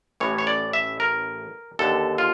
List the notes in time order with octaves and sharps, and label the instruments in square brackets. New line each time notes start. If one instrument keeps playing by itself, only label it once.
[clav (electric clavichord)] A1 A2 E3 C#5
C#5
D5
E5
A#4
D#2 D3 A4
F4